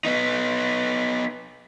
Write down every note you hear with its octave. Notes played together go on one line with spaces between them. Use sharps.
B3 D#4